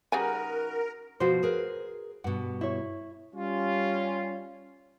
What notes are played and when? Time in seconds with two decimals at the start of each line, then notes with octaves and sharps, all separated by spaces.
0.12 C#3 G3 D#4 F#4 A#4 B4 G#5
1.20 B2 F3 F#4 C5
1.43 G#4 A#4 B4
2.24 G2 B2 F#5
2.61 E4 C#5
3.35 G3 C#4 F4